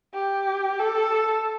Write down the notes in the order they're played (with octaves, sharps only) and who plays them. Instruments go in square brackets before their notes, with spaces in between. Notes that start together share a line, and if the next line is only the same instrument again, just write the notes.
[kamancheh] G4
A4